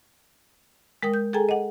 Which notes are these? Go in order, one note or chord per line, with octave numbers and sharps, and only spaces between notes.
G#3 A#4 G5 D#6
G6
G#4 A4 G5 G#5 A#5
D#5 F#5